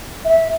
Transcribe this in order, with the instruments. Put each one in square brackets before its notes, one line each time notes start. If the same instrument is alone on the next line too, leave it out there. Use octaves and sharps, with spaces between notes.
[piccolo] E5